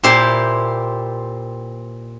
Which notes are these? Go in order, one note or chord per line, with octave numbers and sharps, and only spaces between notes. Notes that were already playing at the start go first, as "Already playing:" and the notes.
A#2 E4 G4 C5